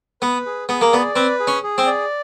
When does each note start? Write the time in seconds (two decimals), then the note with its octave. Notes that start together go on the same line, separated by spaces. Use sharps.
0.22 B3 B4
0.46 G#4
0.69 B3 G#4
0.81 A#3
0.93 B3 D5
1.15 C4 B4
1.40 G#4
1.47 C#4
1.63 G#4
1.78 C4
1.86 D5